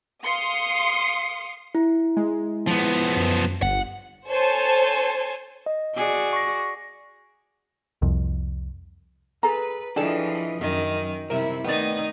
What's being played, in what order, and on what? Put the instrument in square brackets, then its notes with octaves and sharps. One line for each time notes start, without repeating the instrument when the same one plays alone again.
[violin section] F5 C6 D#6 C7 C#7
[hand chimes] E4
[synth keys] G#3
[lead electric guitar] F3 B3
[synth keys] F#2
[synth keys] G1 [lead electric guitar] F#5
[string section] A4 C5 C#5 G#5 A5
[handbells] D#5
[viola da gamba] F#4 G#4 D5
[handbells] C#6 A#6
[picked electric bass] C2 F2
[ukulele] G#4 A4 A#5 [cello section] B4
[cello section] E3 F3 D#5 [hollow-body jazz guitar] D4 G#4 A4 [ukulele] G5
[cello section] F#2 [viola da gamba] D#3 [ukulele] D#5 E5
[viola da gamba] C3 [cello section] G3 E4 [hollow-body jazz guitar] A#4 D#5 E5
[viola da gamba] D#3 D#4 [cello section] A3 D#5 [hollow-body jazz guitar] B3 [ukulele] D5 G5